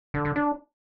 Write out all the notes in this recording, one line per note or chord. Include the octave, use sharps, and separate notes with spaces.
D3
D3
D4